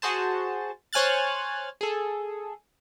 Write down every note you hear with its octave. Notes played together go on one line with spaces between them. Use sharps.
F#4 G#4 C5 A5
C5 C#5 G#5 F6 F#6 A6
G#4 A4